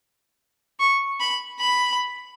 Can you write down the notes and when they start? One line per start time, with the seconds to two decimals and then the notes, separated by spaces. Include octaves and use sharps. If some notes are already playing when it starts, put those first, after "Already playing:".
0.80 C#6
1.20 B5
1.59 B5